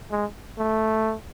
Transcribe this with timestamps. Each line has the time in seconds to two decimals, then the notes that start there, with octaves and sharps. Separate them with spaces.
0.11 G#3
0.58 A3